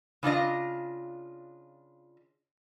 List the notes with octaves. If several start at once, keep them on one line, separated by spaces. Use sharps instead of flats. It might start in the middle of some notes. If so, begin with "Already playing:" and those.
C#3 D4 F4 D#5